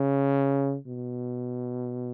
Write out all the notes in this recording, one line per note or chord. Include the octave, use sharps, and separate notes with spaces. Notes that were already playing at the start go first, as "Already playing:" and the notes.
Already playing: C#3
B2